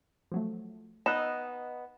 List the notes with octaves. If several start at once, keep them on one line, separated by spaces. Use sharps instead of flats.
F3 F#3 A3
B3 D#4 D#5 A#5 B5 E6 F#6 E7